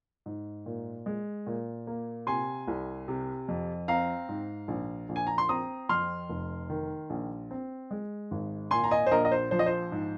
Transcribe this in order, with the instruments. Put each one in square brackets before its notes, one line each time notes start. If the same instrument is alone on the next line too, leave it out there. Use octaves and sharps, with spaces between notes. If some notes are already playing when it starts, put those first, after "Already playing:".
[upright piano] G#2
A#2
G#3
A#2
A#3
C3 G#5 C6
C2
C3
F2
C4 F5 A#5
G#2
A#1
A#1
G#5
A#5
C6
C4 A#5 D#6
F2 C6 F6
F1
D#3
A#1
C4
G#3
G#1
A#2 G#5 C6
A#5
D#5 G#5
C5
A#1 A#4 D#5
D#5
C5
F3 C5
D#5
C5
G#2